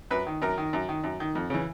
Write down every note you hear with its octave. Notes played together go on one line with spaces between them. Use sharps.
F#2 B4
D#3
F#2 A#4
D#3
F#2
D#3
F#2
D#3
F2
C#3 E3